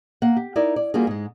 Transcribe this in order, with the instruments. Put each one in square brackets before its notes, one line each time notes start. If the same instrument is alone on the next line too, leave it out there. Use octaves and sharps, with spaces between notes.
[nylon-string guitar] A#3 F#5
G4
D#4 E4 A#4 D5
D5
G3 A#3 F4 F#4 G#4
G#2 G#3